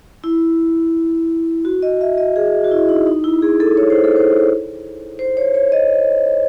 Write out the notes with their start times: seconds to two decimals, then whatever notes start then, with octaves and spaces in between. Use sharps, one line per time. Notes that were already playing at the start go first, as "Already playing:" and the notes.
0.24 E4
1.65 F#4
1.83 D#5
2.01 E5
2.18 D#5
2.36 G#4
2.64 F#4
2.71 E4
2.89 D#4
3.06 D#4
3.24 E4
3.42 G#4
3.60 A4
3.77 C#5
3.90 C5
4.04 A4
4.16 C5
5.19 C5
5.37 C#5
5.54 C#5
5.72 D#5